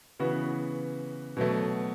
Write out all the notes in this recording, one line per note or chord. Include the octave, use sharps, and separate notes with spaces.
C#3 E3 B3 F#4
B2 F#3 A3